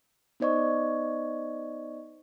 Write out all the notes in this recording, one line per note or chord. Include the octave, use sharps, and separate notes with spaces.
B3 D#4 C5 D5 D#5 C#6